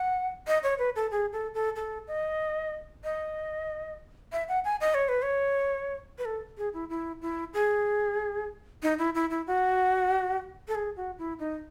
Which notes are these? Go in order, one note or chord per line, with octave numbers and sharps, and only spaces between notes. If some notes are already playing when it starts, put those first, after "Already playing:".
Already playing: F#5
D#5
C#5
B4
A4
G#4
A4
A4
A4
D#5
D#5
E5
F#5
G#5
D#5
C#5
B4
C#5
B4
A4
G#4
E4
E4
E4
G#4
D#4
E4
E4
E4
F#4
A4
G#4
F#4
E4
D#4